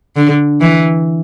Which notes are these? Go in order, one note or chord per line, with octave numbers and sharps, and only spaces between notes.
D3
E3